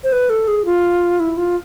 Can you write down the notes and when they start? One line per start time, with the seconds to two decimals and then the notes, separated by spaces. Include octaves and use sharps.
0.04 C5
0.12 B4
0.30 A4
0.48 G#4
0.65 F4
1.20 E4
1.37 F4